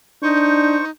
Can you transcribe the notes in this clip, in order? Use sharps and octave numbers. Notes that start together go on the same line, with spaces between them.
D4 D#4 C5 C#6